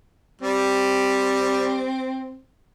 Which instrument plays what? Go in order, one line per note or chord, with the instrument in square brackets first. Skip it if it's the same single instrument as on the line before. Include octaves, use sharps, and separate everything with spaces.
[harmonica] G3 [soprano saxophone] C4